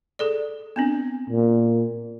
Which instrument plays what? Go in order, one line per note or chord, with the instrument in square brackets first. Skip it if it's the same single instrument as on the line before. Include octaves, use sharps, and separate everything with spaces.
[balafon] G#4 A4 D5
B3 C4 D4
[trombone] A#2